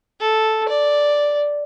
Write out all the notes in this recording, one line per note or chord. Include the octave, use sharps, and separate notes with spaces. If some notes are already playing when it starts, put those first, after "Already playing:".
A4
D5